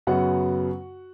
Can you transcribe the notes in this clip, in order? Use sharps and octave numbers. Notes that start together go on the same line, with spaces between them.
F#2 C#3 F#3 B3 F#4 F#5